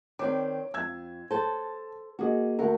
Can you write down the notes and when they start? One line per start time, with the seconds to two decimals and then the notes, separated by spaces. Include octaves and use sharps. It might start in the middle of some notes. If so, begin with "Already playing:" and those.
0.19 D#3 C4 C#5 D5 D6
0.74 F2 E6 G#6
1.31 A4 C5 A5
2.19 A#3 F#4 G#4 D#5
2.59 D2 A3 A#4 F#5